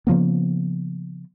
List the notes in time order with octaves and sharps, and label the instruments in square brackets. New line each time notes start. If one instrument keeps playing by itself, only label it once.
[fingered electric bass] C#3 F3 A#3 B3